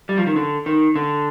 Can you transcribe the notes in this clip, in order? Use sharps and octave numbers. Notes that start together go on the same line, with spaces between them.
G3
F3
D#3
D3
D#3
D3